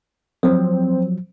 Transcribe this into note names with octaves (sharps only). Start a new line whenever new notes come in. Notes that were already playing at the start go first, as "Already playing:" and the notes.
F3 F#3 C4